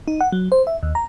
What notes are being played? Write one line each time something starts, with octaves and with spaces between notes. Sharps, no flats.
D#4
F#5
F#3
C5
E5
D#2
A#5